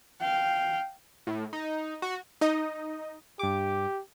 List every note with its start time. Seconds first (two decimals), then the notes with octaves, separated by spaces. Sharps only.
0.21 F5 G5
1.27 A2
1.53 D#4
2.02 F#4
2.41 D#4 D#5
3.39 G2 G4 D6